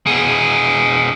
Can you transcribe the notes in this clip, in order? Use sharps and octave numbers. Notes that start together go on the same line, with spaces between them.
B2 G#4